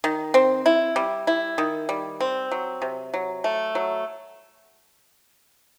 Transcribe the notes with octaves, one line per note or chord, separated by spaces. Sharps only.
D#3
C4
E4
G3
E4
D#3
G3
C4
F#3
C3
F#3
A3
F#3